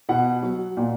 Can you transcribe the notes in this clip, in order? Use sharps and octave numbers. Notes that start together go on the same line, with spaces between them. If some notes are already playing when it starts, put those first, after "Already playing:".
B2 F#5
F#3
A#2